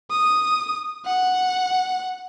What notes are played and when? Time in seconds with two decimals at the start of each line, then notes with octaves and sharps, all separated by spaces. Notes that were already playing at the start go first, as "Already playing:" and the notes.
0.10 D#6
1.06 F#5